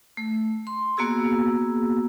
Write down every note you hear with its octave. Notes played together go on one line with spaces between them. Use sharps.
A3
C6
A#3 B3 F#4 G#4 E6